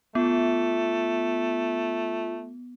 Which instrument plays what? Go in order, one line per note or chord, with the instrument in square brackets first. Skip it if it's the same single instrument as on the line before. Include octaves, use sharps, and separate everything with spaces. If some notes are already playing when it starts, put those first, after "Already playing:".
[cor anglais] A3 [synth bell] B3 [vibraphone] F4